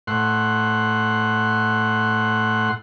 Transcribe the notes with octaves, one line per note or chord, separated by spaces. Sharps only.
A2 F#5 C6